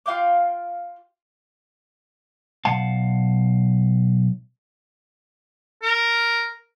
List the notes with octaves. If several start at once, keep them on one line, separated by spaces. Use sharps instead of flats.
F4 F5 G5 D6
B1 F5 F#5 A5
A#4